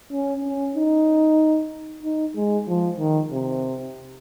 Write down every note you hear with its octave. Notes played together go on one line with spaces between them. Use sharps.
C#4
C#4
D#4
D#4
G#3
F3
D#3
C3